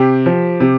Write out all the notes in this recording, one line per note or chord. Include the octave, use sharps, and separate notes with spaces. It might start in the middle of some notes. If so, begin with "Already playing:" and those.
Already playing: C3 G4
F3
C3